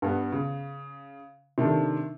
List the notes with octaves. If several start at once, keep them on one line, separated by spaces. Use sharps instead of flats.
G2 B3
C#3
C3 D#3 A3 D4